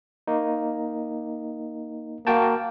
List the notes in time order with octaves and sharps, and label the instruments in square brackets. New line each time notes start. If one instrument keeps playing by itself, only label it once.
[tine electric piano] A#3 D#4
[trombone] A#3 [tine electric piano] F#4 G5 A5